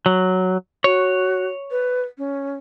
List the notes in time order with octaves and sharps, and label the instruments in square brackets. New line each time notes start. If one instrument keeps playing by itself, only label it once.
[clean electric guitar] F#3
[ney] F#4 [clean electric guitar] C#5
[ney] B4
C#4